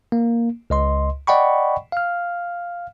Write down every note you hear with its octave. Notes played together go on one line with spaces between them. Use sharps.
A#3
C#2 D#5 C6
D5 D#5 F#5 G5 B5 C#6
F5 F6